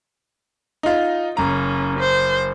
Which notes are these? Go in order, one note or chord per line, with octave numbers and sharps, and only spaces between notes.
D#4 F4
F#1 C#4 A#5
C5